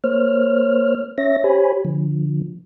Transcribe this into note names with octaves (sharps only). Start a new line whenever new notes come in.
A#3 C5 C#5 F6
C#4 C#5 E5 A#6
G4 C5 C#5 G#5 B5
D3 F3